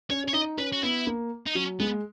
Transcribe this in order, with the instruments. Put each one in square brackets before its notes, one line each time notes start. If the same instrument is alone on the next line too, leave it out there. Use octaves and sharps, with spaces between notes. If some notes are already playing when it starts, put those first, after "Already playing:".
[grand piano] C#4 [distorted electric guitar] C#5
[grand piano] C#4 [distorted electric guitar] C#5
[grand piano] D#4 [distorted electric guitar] D#5
[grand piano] C#4 [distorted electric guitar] B4
[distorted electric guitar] F#4
[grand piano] B3 [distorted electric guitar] E4
[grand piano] A#3
[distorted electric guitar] D#4
[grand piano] F#3 [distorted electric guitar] C#4
[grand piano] G#3 [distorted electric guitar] B3